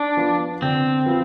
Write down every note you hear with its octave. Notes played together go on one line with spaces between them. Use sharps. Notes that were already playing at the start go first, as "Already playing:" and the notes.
Already playing: D4
F3 B3 F4 B4
D3 C4
F3 B3 F4 B4